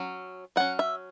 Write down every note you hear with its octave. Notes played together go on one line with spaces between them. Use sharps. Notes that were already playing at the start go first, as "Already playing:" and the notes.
Already playing: F#3 C#4
F#3 C#4 F#5
E5